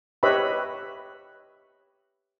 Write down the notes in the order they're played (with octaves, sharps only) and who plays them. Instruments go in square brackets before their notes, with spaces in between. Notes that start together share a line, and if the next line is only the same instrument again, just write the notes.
[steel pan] G4 B4 C#5 D#5 E5 B5